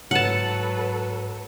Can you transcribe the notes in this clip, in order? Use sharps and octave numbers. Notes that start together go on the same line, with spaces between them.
G#2 F#3 A4 B4 F#5 A5